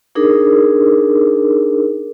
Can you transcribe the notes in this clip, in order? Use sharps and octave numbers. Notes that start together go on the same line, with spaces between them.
D4 D#4 G#4 A#4